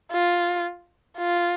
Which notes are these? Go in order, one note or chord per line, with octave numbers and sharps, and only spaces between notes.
F4
F4